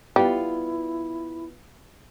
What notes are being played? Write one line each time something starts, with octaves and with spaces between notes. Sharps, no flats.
G3 B3 E4 F4